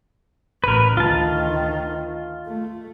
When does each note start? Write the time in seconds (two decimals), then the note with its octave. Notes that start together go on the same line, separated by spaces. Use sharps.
0.64 A1 A#4 B4
0.97 D2 D#3 F4 A5
2.47 A3